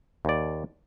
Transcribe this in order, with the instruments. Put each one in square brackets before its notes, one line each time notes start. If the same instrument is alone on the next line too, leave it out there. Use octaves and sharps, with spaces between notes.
[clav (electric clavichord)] D#2 D5